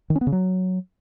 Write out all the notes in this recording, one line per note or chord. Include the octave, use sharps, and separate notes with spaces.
D#3
C#4
B3
C#3
F#3